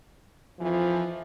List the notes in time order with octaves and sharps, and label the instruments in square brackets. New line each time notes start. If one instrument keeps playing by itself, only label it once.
[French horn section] F2 E3 F3